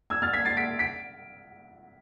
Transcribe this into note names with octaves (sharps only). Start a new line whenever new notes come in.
E6 G#6
F6 A6
G#6 B6
A6 C7
B6 D7
B6 D7